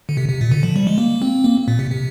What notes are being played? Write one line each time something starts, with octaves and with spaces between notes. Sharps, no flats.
D3
C3
C3
A#2
D3
F3
G3
G#3
A#3
C4
A#3
A#2
C3
C3